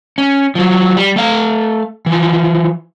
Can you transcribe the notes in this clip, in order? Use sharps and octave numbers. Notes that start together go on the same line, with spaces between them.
C#4
F3 F#3
G3
A3 F5
E3 F3